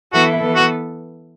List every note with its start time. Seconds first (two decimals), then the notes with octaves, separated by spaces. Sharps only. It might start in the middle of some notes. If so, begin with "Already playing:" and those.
0.13 E3 B3 E4 F#4 A4
0.42 E3 B3 A4
0.55 F#4